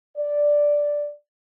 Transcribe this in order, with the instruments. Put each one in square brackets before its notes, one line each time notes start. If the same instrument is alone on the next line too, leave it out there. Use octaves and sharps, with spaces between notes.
[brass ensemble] D5